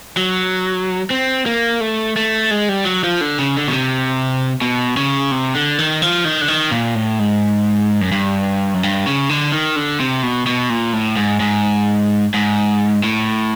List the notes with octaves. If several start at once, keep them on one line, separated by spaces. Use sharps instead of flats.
F#3
C4
A#3
A3
A3
G#3
G3
F#3
F3
D3
C#3
D3
B2
C3
B2
C#3
C3
D3
D#3
F3
D#3
D3
D#3
A#2
A2
G#2
F#2
G2
F#2
G2
C#3
D3
D#3
D3
C3
B2
B2
A#2
A2
G#2
G#2
G#2
A2